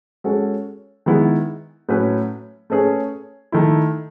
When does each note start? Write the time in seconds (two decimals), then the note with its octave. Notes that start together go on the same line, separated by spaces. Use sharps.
0.24 G#3 C#4 F#4 A4
1.06 D#3 G#3 B3 E4
1.89 A2 F#3 C#4 F#4 B4
2.70 A3 C#4 G#4 B4
3.52 D#3 A3 E4